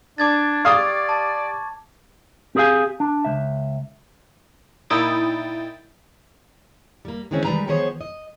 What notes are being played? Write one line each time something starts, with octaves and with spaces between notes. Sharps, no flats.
D4 D6 G#6 A6
G4 D5 F5 C#6 D#6
A5
C4 G4 G#4 B4 F5 G#5
D4
C#2 E5
A#2 D#4 E4 G5 D#6 A6
G3 A#3
D#3 E3 G#3 C4 C#4
D#3 G3 G#3 B4 A#5
D#3 F3 B3 G#4 C5 C#5
D#5